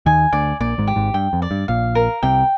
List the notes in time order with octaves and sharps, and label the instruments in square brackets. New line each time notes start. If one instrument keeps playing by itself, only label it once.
[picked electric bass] D#2 D#3 [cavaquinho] G#5
[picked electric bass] D2 D3 [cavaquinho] D5
[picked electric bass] A#1 A#2 [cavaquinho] D5
[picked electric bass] G#1 G#2
[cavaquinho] G4
[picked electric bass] G#1 G#2
[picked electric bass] G2 [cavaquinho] G5
[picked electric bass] F2
[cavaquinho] D5
[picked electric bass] G2
[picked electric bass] A#1 A#2 [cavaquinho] F5
[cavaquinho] A#4
[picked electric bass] C2 C3 [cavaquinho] G5